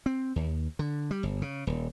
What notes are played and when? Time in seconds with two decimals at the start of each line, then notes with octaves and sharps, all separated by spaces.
0.06 C4
0.36 D#2
0.79 D3
1.11 G3
1.23 G1
1.42 C#3
1.67 D#1